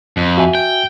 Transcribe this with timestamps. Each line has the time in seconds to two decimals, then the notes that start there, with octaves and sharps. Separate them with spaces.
0.17 F2
0.38 F#4 E5 G#5
0.55 G5